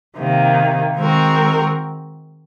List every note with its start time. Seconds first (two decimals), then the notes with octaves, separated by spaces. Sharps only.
0.17 C3 D#3 A#3
0.96 D#3 G#3 C4 F#4 A#4